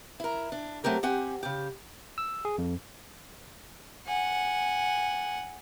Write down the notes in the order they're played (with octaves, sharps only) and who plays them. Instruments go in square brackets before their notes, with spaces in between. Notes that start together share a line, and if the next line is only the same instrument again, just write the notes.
[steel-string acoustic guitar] E4 A#4
D4
F#3 A3 C4 G4 A#4
C4 G4 F#5 G#5
C#3 G4
[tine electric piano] E6
G#4
F2
[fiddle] F#5 G#5